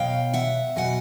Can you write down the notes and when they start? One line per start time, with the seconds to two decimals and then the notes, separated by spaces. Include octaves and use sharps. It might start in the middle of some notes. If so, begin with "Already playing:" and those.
Already playing: B2 F#3 F5 G5
0.34 E5 F#5
0.76 B2 F#3 F#5 G#5